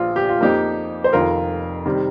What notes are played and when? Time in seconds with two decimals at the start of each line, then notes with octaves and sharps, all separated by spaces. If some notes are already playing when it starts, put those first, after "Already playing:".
Already playing: A#1 A#2 F3 F4
0.16 G4
0.29 F4
0.41 F2 F3 A#3 D#4 G4
1.04 C5
1.13 F1 F2 D#3 F4 A#4
1.86 C3 D#3 G3